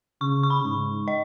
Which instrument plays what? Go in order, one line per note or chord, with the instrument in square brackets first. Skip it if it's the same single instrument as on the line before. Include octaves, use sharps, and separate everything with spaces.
[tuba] C#3 [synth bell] C#6
[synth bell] C#6
B5
[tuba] G#2
[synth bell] D#5